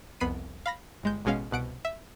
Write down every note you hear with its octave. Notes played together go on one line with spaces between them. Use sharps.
C2 F2 B3 B5 C7 D#7
F5 B5 A#6
G1 G#3 G6
A1 B2 G#3 C#4 F5
C2 B2 F#5 D7
E5